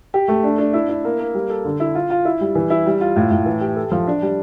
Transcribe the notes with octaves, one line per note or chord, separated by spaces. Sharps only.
G4
A3
D4
D4
E4
E4
A#3
A#3
G3
A4
D3
E4
F4
F4
E4
G3
E3
E4
G3
F4
A2
A2
E3
G4
A4
F3
D4
G3